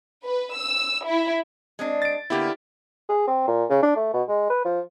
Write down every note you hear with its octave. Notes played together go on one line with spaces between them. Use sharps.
B4
E6
E4
G#3 C4 D4
A6 D7
D3 A#3 B3 E4 G4
G#4
C4
A#2
C#3
D4
A3
B2
G#3
B4
F3